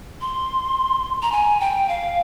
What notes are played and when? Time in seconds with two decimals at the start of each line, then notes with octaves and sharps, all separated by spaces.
0.21 C6
1.22 A#5
1.32 G#5
1.60 G5
1.89 F5